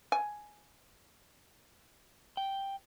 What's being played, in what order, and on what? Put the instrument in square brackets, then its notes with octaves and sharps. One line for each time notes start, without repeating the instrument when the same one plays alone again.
[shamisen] G#5
[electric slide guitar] G5